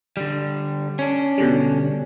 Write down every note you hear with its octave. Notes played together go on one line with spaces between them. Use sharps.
D3 G3
C#4 D4
B2 D3 G3